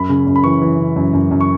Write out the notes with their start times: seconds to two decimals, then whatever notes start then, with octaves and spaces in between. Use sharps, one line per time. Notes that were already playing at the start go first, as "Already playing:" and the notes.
Already playing: F#2 B5
0.09 C#3
0.27 F#2
0.36 B5
0.44 E3 C#6
0.62 E3
0.78 C#3
0.96 F#2
1.13 F#2
1.31 F#2
1.41 C#6